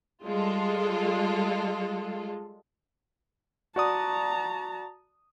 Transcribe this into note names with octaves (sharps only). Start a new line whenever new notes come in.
G3 G#3 F4 A4
F#4 D5 A5 A#5 D#6